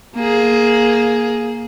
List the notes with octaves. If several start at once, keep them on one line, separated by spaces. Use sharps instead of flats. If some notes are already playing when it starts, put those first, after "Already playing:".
A#3 G#4